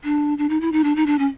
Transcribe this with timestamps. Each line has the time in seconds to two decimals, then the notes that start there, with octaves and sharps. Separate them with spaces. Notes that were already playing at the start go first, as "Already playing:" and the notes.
0.04 D4
0.38 D4
0.49 D#4
0.61 E4
0.72 D#4
0.84 D4
0.96 D#4
1.06 D4
1.19 C#4